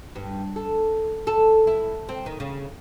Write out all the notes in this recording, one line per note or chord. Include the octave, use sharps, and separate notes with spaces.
G2
A4
A4
E4
C4
D#3
C#3